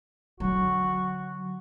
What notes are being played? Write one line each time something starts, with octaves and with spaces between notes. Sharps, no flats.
D3 F#3 F#4